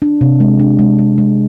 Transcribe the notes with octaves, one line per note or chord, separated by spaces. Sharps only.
D4
C3
G#3
D4
G#3
G#3
G#3